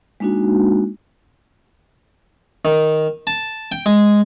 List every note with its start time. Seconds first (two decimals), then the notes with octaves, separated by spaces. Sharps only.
0.20 G#3 A#3 D4 D#4 F#4
2.65 D#3
3.27 A5
3.72 G5
3.86 G#3